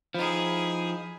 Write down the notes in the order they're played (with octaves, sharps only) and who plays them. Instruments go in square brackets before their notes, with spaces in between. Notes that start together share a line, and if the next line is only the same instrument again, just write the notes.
[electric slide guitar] F3 D#4 [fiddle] E4 G#4